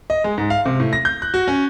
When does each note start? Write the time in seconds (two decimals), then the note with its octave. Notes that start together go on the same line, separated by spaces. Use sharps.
0.10 D#5
0.24 G#3
0.38 G#2
0.50 F5
0.65 C3
0.80 A2
0.93 A#6
1.05 G6
1.22 F#6
1.34 F#4
1.48 C#4